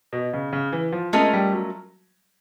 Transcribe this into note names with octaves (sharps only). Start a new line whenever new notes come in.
B2
C#3
C#3
E3
F3
G#3 A3 C#4 F4 A#4 D#5
G3
F#3